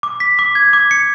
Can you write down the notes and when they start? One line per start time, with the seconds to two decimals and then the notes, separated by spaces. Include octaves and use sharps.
0.03 D6
0.20 B6
0.39 D6
0.55 G#6
0.73 D6
0.91 C#7